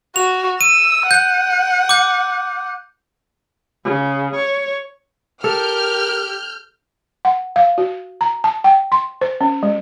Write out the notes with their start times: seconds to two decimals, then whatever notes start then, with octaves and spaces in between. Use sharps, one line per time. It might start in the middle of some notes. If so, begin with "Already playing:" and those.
0.16 F#4 F7
0.61 E6 D#7
1.11 F#5 F#6 G6
1.89 D6 G6
3.84 C#3
4.35 C#5
5.44 G4 A4 A#4 F6 G6
7.25 F#5
7.56 F5
7.78 F#4
8.21 A#5
8.44 A5
8.64 G5
8.92 C6
9.21 C5
9.41 C#4
9.63 G#3